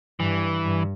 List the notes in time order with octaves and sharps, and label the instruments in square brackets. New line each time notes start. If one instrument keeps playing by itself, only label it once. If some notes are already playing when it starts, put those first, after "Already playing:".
[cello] G2 [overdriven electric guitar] E3
[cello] G2